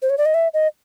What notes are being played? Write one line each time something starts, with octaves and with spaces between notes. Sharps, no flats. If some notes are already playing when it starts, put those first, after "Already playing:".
C5
C#5
D5
D#5
E5
D#5